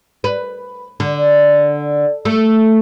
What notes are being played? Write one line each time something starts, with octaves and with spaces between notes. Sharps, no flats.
B4
D3
A3